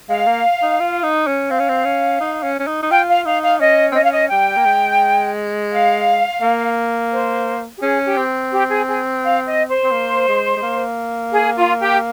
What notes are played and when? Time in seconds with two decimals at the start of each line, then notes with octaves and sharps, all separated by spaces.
0.09 G#3 F5
0.27 A#3
0.62 D#4
0.80 F4
1.03 D#4
1.27 C#4
1.51 C4 F5
1.59 C#4
1.69 C4
1.84 C#4
2.20 D#4
2.43 C#4
2.59 C#4
2.67 D#4
2.83 D#4
2.90 F4 G5
3.08 F5
3.25 D#4 F5
3.43 F5
3.60 C#4 D#5
3.92 C4
3.95 C#4 D#5
4.04 F5
4.12 D#5
4.30 G3 G5
4.56 A#3
4.66 G#3
5.72 F5
6.42 A#3
7.12 C5
7.77 G4
7.82 C#4 G#4
8.06 G4
8.17 C4
8.52 G4
8.69 G#4
8.88 G#4
9.23 F5
9.46 D#5
9.69 C5
9.84 C4
9.92 A#3
10.28 G#3
10.57 G#3
10.63 A#3
11.32 G#4
11.57 F4
11.80 G4